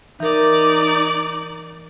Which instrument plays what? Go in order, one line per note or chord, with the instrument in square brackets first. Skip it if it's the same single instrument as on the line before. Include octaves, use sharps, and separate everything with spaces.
[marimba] E3 A#4 [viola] D#4 D5